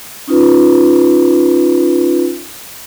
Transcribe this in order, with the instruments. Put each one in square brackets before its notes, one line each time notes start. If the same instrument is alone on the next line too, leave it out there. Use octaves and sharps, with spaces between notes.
[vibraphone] C#4 D#4 F4 B4